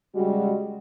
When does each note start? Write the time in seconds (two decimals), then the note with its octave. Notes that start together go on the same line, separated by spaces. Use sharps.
0.15 C#3 G3 G#3 F#4